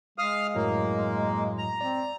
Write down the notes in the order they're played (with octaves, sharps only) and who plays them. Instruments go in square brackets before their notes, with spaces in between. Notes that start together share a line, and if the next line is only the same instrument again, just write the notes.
[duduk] G#3 [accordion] F5 D#6 F6
[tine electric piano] F#2 A2 F#3 [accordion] A#3
[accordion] A#5
[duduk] C4 [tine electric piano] D5